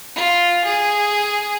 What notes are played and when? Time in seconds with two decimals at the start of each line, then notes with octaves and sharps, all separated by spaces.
0.15 F4
0.64 G#4